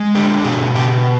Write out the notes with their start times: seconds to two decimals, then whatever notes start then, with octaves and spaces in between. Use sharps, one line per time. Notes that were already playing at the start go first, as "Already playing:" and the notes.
Already playing: G#3
0.15 D3 G4
0.44 B2 G#4
0.75 B2 G4